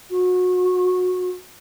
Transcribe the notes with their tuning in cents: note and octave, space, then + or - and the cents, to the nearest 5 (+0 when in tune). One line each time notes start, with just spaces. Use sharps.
F#4 -25